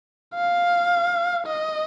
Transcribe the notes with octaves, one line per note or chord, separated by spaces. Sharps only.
F5
D#5